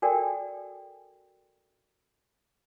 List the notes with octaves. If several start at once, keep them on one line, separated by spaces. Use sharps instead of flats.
F#4 A4 A#4 D5 G5 G#5